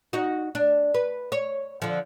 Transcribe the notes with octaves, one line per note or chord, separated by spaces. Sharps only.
D#4 F#4
D4
B4
C#5
D3 F3